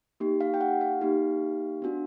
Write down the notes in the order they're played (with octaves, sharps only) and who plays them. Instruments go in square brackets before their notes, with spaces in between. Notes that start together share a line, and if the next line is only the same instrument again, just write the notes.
[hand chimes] A#3 D#4 G4
F5
G5
F#5
F5
A#3 D#4 G4
B3 D4 F#4